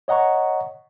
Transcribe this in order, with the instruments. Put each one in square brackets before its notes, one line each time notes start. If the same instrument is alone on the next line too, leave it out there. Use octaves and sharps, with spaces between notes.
[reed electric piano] C#5 D#5 F#5 A#5 C#6